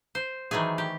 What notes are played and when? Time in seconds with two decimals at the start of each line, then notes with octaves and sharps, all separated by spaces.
0.15 C5
0.51 D#3 E3 F#3 A3 G#4
0.78 G4